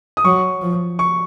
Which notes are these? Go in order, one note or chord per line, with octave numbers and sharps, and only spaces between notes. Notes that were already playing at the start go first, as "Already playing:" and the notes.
D#6
F#3 C#6
F3
C#6